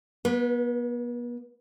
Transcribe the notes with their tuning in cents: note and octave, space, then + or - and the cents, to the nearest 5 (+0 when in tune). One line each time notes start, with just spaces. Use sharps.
B3 -40 B4 +0